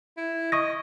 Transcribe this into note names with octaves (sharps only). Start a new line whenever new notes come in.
E4
D#5 C#6 D#6 A#6